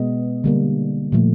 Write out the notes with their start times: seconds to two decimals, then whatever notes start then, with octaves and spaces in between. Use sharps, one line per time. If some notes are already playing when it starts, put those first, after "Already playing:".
Already playing: B2 G#3 B3 D#5
0.44 D3 G3 A#3
1.12 A#2 F3 A3